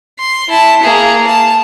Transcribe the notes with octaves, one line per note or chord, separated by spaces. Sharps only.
C6
E4 A5
A#3 G#4
A5